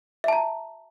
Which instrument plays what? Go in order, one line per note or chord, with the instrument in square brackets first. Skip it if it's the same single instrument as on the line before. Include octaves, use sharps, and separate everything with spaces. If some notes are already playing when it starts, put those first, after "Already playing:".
[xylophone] E5
A5
A#5